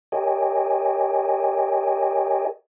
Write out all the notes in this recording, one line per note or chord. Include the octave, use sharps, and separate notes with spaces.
G4 A#4 C#5 D#5 G5 G#5